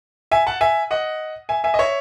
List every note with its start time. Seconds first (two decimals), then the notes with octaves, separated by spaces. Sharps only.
0.31 E5 G#5
0.47 F#5 A5
0.61 E5 G#5
0.91 D#5 F#5
1.49 E5 G#5
1.64 E5 G#5
1.74 D#5
1.79 C#5 E5